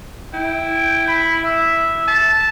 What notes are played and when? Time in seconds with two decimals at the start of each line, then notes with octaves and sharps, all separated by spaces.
0.34 E4 G5
1.08 B5
1.44 E5
2.08 A5